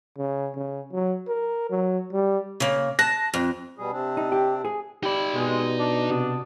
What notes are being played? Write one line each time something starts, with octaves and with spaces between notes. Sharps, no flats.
C#3
C#3
F#3
A#4
F#3
G3
C#3 A#3
A5 F#6 A#6
F2
B2 G3 G#4
C3 C4 D4
D#4
G4
G#4
D#4 G4 D5 B5
B2 G#3
D4
C3 F#4 D#6